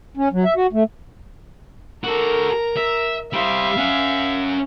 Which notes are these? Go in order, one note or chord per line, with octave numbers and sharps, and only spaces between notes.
C#4
F#3
E5
F#4
A3
F#4 A4 A#4 A#5
E5
G3 C5 E5 F5
C#4 F#5